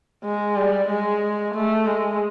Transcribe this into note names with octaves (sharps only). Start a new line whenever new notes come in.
G#3
G3
G#3
A3
G#3